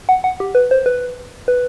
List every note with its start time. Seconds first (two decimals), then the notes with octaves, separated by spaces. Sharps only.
0.09 F#5
0.24 F#5
0.40 G4
0.55 B4
0.71 C5
0.86 B4
1.48 B4